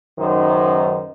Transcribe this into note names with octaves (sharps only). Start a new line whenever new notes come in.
C#2 F#2 D#3 D#4 C5